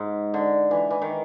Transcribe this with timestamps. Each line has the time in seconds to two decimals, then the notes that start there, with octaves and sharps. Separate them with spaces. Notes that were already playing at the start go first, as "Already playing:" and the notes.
Already playing: G#2
0.34 D3
0.71 E3
0.90 E3
1.02 D#3